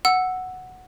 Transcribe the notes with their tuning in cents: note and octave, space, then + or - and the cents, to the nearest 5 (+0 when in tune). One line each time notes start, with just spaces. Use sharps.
F#5 +0 E6 +0